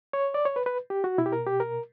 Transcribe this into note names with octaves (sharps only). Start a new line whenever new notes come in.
C#5
D5
C#5
B4
B4
G4
F#4
B2 E4
G4
A#4
G4
A#4